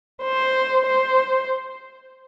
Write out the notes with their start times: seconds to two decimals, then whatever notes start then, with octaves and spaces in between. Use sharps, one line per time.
0.23 C5
0.86 C5